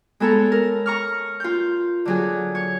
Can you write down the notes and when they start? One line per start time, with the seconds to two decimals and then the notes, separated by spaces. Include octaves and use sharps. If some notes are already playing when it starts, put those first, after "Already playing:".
0.20 G#3 B3 A4 C#5 A#5
0.52 A#4
0.86 A#5 C#6 F6
1.40 F4 G6
2.05 D3 F#3 G#4
2.55 C#5